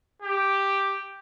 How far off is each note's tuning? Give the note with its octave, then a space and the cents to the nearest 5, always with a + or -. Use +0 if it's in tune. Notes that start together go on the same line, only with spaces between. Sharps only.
G4 +0